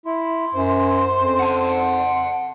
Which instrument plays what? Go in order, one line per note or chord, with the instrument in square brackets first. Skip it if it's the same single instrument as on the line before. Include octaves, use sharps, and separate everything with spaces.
[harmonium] E4 [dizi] C6
[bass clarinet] F#2 [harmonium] C5
[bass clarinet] F2
[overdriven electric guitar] F#5 A5